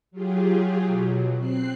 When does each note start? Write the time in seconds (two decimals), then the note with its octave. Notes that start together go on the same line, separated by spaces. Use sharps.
0.11 F#3 F4 G4 G#4
0.85 B2 F#3
1.37 C4 F#6 C7